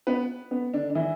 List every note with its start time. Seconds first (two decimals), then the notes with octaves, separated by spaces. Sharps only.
0.07 B3 B4
0.51 B3
0.73 D3 D4
0.90 D4
0.95 E3 E4